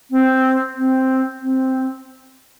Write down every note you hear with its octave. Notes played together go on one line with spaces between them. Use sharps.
C4
C4
C4